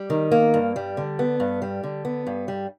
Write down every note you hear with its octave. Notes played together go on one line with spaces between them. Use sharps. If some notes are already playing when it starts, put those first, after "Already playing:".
Already playing: G3
D#3
A#3
G2
G3
D3
B3
G2
G3
D3
B3
G2
G3